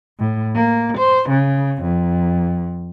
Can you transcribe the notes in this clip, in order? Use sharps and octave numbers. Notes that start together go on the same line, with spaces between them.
A2
A#3
C5
C#3
F2